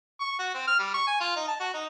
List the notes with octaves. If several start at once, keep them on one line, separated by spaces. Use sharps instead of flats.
C#6
F#4
C4
F6
G3
C#6
G#5
F4
D#4
A5
F#4
D#4